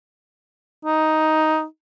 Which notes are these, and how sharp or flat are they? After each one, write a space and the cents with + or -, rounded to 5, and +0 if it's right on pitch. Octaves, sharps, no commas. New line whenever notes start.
D#4 +5